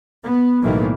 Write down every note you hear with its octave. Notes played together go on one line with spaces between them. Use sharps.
B3
B1 A2 D#3 E3 A3 A#3